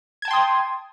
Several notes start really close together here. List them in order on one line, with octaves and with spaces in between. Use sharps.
G#6 A5 G5 C6 D#6